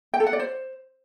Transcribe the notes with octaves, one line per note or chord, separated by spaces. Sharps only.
G5
A4
F#5
D5
C5